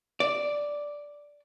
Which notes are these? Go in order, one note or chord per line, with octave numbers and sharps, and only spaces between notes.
D5